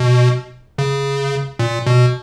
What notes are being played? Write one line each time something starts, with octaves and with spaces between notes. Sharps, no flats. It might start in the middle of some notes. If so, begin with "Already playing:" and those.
Already playing: B2
C#3
A#2
B2